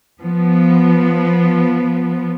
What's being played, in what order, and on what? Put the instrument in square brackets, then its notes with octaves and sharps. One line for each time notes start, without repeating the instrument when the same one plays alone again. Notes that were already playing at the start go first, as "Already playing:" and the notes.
[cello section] F3 B3